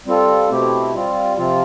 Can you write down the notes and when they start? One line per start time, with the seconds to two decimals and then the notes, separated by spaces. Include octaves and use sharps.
0.06 G3 C4 F4 A4
0.50 B2 A3 C4 E4 G4
0.94 G3 C4 F4
1.37 C3 F3 C4 F4